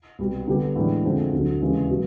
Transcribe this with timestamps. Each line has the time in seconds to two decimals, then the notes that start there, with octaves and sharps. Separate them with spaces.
0.19 C2 B2 G3
0.47 D3 G3 B3 D4 G4
0.76 A2 E3 G#3 B3 D4
1.04 F2 D3 F3 G#3 C4
1.33 D2 D3 F#3
1.61 D#2 C#3 E3 G#3
1.89 B2 F#3